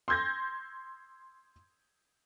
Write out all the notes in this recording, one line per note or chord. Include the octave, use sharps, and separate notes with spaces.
C6 E6 G6 G#6 A#6